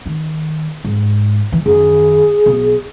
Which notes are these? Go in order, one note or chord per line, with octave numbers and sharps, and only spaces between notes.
D#3
G#2
E3
F#2 D#3 G#4
B1